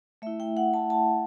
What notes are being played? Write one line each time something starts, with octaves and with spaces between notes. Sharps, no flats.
A3 E4 E5
G5
F#5
A5
A5